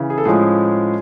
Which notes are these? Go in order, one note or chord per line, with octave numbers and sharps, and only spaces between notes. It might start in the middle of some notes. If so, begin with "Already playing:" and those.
Already playing: C#3 E3
G#4
A4
A2 F3 G#3 C#4 G#4